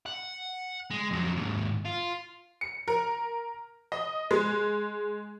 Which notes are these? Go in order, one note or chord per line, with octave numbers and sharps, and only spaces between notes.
F#5
G#3
F2 F#3
D#2 G#2
F4
C#7
A#4
D#5
G#3